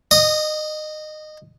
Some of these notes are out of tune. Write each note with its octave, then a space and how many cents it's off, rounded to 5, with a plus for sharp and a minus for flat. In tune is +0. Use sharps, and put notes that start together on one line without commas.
D#5 -20 D#6 +0